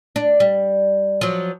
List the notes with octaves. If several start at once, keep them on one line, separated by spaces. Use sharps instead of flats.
D4
G3
F3 F#3